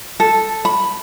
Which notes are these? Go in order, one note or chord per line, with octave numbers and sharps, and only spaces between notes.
A4
B5